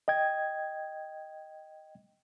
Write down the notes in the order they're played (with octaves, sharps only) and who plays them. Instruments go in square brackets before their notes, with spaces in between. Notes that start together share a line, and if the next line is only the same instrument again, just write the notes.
[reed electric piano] D#5 G5 G#6